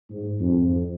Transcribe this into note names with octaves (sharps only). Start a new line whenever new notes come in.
G#2
F2